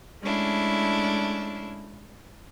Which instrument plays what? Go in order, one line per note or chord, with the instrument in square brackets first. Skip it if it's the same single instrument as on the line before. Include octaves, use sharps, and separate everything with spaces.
[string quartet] G#3 A3 C#4 D4 E4